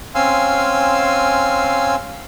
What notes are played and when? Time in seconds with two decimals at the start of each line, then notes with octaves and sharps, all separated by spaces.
0.15 C4 C#4 F5 G#5 C6 E6